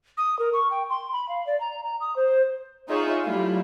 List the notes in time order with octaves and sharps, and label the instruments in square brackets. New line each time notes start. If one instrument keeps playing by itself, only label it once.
[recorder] D#6
A#4
C#6
G5
C6
B5
F5
D5
A#5
A#5
D#6
C5
[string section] D#4 F4 G#4 C#5 D#5 E5
F#3 G3 A3 E4 F4